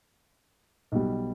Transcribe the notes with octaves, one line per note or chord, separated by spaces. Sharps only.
B1 B2 G3